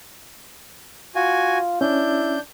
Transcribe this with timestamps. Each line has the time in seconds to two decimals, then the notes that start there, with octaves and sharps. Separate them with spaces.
1.15 F4 F#4 G#5
1.81 C#4 D4 E4 G6